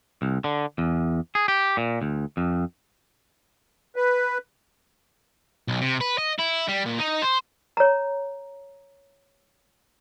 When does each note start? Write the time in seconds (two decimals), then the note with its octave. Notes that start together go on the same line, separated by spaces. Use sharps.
0.22 C2
0.44 D3
0.78 E2
1.35 G#4
1.48 G4
1.77 A#2
2.02 D2
2.37 F2
3.96 B4
5.68 B1
5.81 C3
6.01 B4
6.18 D#5
6.39 E4
6.68 G3
6.85 A#2
6.99 D#4
7.22 C5
7.77 C#5 A#5